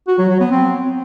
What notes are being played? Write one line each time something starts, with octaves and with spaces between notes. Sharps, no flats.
F#4
F#3
F#3
B3
C4